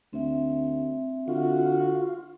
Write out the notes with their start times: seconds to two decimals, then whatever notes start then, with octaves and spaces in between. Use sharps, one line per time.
0.13 D2 C4 E5
1.28 D3 F4 F#4